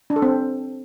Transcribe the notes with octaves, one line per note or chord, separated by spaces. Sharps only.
D4
A4
C4